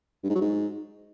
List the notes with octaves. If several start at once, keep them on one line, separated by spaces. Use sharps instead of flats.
G2
G#2
F#3
G#2